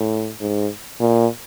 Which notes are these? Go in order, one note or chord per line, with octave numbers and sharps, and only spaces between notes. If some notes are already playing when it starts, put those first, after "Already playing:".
Already playing: A2
G#2
A#2